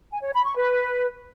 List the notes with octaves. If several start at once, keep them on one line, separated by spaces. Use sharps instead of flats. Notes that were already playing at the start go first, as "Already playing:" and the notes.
G#5
C#5
B5
C#6
B4